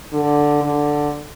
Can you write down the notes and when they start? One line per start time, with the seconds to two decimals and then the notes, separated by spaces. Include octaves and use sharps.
0.13 D3
0.64 D3